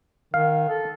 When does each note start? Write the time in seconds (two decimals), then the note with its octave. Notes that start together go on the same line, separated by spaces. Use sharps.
0.34 D#3 F5
0.69 A4